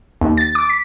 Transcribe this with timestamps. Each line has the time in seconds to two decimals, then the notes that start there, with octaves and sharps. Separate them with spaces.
0.21 D#2
0.37 A6
0.55 D6
0.69 B6